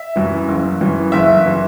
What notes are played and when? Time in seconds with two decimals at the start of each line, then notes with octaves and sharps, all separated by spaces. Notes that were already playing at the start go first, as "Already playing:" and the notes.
Already playing: E5
0.16 F#2 E3
0.48 F#1
0.81 F#2 E3
1.12 F#1 E5
1.46 E3